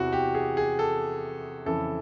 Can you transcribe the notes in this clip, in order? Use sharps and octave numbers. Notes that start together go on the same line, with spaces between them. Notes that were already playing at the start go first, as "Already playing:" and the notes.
Already playing: E2 C3 E3 F#4
G4
G#4
G#4
A4
F2 C#3 E3 A4